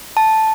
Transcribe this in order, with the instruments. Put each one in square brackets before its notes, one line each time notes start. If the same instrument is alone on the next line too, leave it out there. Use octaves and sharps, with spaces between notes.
[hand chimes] A5